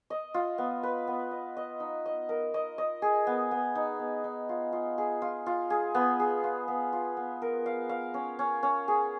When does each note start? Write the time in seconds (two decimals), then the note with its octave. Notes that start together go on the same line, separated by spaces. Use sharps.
0.10 D#5
0.34 F4
0.58 B3
0.83 B4
1.07 B3
1.31 D#5
1.57 D#5
1.80 D#4
2.06 D#5
2.29 A#4
2.54 D#5
2.78 D#5
3.02 G#4
3.27 B3
3.51 B3
3.75 D#4
3.99 B3
4.24 D#4
4.49 F4
4.73 F4
4.98 G#4
5.22 F4
5.46 F4
5.70 G#4
5.95 B3
6.20 G#4
6.44 F4
6.68 B3
6.93 F4
7.17 B3
7.42 A#4
7.66 F5
7.89 F5
8.14 C#4
8.39 C#4
8.63 C#4
8.88 G#4